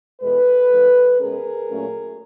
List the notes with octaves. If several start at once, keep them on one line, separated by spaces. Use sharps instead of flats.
E2 B2 G#3 A4 B4
D3 F3 A3
B2 G#3 C#4 G#4 A#4
A#2 F#3 A3 C#4